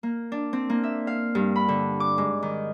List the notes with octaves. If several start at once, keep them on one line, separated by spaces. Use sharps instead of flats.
A#3
D4
C4
A#3
E5
F5
G2
B5
D3
D6
G#2
D#3